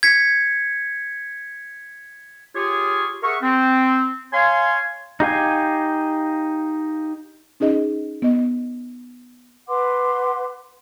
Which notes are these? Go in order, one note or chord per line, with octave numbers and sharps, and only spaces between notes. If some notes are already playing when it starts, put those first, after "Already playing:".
G#6 B6 C#7
F4 G4 G#4 C#5
G#4 A#4 E5 F#5 C#6
C4
C#5 F5 G#5 C6
D#4 G4 F5 G#5
C#4 D#4 G#4 D#5
B3 D#5
B4 F#5 C6 D6